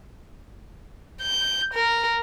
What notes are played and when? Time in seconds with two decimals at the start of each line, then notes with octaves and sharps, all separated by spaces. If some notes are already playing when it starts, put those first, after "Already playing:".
1.22 G6
1.74 A#4